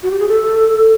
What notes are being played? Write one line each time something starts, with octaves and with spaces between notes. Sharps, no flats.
F#4
G4
G#4
A4